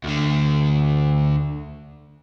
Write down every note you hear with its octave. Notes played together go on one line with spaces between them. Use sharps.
D2 D3